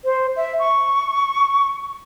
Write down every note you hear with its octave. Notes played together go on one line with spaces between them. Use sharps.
C5
E5
C#6